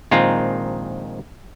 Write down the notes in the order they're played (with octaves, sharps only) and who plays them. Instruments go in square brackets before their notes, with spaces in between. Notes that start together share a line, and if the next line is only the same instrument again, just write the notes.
[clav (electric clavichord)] A#1 D#3 G#3 C4 F4 A#5